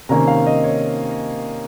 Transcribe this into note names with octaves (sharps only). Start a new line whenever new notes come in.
C3 D#3 A#3 C#4 A#5
F5
D#5
C#5